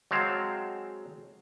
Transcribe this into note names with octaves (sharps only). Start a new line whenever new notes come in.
F#3 G#3 C4 F5 A5